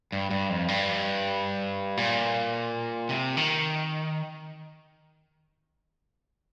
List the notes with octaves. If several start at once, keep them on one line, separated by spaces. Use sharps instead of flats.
G2
G2
F2
G2
A#2
C3
D#3